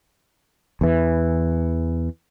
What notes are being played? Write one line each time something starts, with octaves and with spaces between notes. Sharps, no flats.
E2 E3